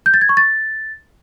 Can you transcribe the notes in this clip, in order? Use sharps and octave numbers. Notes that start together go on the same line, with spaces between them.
G6
A6
G#6
C#6
A6